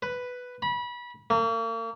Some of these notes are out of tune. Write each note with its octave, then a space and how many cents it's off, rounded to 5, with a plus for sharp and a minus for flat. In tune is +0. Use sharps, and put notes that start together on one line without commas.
B4 +5
B5 -25
A#3 -40